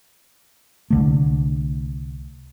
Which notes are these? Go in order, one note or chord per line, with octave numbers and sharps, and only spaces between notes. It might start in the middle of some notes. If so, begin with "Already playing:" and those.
C2 D3 A3